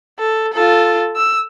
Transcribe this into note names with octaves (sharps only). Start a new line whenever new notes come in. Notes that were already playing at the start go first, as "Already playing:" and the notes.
A4
F4 A4
E6